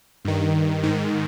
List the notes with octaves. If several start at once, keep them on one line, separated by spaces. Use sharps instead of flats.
G2 D#3
G#2 D#3